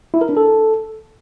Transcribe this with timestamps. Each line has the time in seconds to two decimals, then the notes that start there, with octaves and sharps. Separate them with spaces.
0.14 E4
0.21 A#4
0.29 D4
0.37 A4